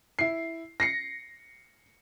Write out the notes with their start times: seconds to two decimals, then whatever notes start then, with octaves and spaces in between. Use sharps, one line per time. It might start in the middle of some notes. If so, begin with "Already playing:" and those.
0.19 E4 C7
0.80 A#6 C7 C#7